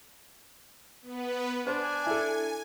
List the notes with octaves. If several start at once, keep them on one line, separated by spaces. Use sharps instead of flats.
B3 B4
D4 C5 G#5
E4 A4